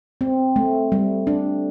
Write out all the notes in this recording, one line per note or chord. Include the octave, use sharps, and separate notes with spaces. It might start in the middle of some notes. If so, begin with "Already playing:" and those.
C4
A3
G3
D4